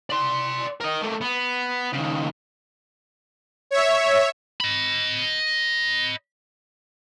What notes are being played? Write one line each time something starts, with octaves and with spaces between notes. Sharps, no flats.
D5 C6
A#4 D#5
A3 A#3
B3
D#2 C#3
C#5 E5
D#5 B5